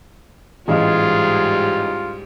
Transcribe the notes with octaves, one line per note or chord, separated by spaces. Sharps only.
A1 G#2 G3 F4 G4 G#4 D#5 F5